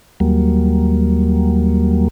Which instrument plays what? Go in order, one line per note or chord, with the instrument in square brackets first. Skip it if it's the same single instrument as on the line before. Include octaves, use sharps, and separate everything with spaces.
[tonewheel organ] D#2 F#3 G3 A#3